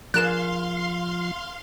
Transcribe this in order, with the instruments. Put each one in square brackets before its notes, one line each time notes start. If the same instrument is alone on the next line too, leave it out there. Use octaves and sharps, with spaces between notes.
[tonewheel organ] F3 [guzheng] G#4 A#4 D5 [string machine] F5 C6 [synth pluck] F#6 E7